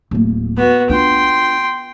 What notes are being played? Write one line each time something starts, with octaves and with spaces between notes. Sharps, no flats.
D1 A#3
B3 F#4
D4 F4 G5 C6